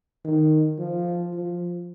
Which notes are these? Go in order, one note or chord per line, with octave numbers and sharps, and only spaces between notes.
D#3
F3
F3